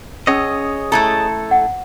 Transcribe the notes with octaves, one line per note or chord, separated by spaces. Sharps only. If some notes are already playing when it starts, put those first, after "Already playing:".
C#4 G#4 C#5 D#5 E6
A3 E4 A4 A#5
F#5